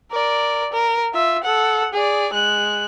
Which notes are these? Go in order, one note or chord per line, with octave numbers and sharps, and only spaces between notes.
A#4 D5
A#4
F4 E5
A4 F#5
G#4 D5
G#3 F#6